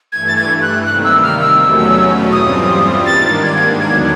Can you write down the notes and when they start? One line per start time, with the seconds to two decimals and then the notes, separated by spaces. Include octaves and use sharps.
0.12 G2 E3 A3 G#6
0.28 A6
0.36 G#6
0.62 F#6
0.86 C3 D#3 G3 A#3 F#6
1.04 E6
1.23 F6
1.41 E6
1.59 E2 B2 F#3 A3 C#4
2.32 G2 E3 G3 C4 F4 D#6
3.06 G#2 D#3 G3 A#3 D4 A6
3.43 G#6
3.80 D#2 D3 F#3 B3 D4 G#6